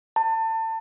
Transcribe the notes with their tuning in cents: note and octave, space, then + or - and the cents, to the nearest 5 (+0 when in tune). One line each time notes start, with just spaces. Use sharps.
A5 +30